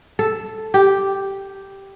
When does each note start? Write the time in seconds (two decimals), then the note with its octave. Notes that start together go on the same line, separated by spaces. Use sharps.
0.19 A4
0.74 G4